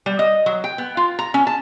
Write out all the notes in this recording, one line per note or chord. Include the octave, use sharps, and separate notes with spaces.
G3
D#5
F#3
G5
B3
F4
A#5
C#4
A5